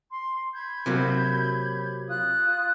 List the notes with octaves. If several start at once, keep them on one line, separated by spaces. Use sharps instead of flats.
C6
B5 G6 G#6
C3 F#3 A#3
F4 D#6 F#6